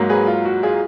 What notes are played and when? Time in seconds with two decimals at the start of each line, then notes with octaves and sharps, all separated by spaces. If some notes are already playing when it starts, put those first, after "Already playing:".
Already playing: G#2 F#3 A#3
0.09 G#4 B4
0.27 F4
0.45 F#4
0.63 F4 G#4